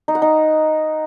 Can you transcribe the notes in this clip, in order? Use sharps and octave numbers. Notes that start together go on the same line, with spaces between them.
D#4
F#5
D#4